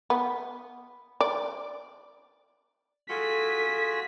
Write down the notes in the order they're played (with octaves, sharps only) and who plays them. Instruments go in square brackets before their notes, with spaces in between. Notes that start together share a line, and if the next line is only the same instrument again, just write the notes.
[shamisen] B3
D5
[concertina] F4 F#4 G#4 [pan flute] A4 [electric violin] B6